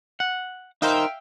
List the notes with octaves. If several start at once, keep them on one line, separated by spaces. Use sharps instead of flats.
F#5
D#4 A#4 C5 E5 F5 G5